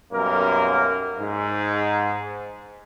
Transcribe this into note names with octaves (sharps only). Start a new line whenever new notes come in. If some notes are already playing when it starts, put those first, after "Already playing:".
B1 F#2 G3 A#3 A#4
G#2